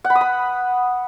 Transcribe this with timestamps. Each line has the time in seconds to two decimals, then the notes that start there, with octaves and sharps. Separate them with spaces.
0.04 F#5
0.10 B5
0.15 D#6
0.21 B5